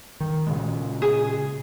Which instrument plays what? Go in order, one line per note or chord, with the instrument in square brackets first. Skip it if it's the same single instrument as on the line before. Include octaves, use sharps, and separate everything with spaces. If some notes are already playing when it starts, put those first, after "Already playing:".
[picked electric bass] D#3
A#2 C#3 G#3
[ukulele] G#4